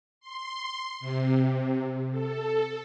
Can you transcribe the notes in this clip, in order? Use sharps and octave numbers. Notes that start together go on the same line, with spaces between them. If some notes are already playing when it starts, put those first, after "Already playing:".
C6
C3
A4